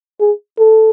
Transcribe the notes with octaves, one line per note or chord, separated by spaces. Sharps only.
G#4
A4